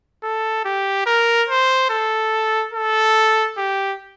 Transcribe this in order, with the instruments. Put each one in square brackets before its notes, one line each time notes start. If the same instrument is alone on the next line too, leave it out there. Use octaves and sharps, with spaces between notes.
[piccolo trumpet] A4
G4
A#4
C5
A4
A4
G4